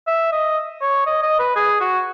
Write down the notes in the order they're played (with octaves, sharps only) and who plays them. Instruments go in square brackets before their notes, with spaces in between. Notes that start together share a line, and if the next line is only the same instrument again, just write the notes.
[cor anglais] E5
D#5
C#5
D#5
D#5
B4
G#4
F#4